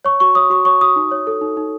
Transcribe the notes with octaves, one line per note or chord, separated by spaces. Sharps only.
C#5 C#6
F#4 C#6
C#5 D#6
F#4 C#6
C#5 C#6
F#4 D#6
D#4
C#5
A4
D#4
D#4